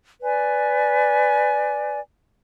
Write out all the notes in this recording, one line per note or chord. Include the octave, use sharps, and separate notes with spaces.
B4 D5 G#5